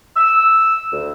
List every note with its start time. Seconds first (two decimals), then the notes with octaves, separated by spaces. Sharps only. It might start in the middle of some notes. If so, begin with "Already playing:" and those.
0.16 E6
0.92 D2